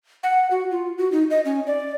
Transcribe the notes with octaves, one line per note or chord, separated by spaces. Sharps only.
F#5
F#4
F4
F#4
D#4
D#5
C#4
D5